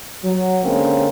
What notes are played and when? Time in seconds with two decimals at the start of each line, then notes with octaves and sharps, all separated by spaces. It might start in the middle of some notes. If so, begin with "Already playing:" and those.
0.24 F#3
0.64 D3 G#3 A#3 C4 C#4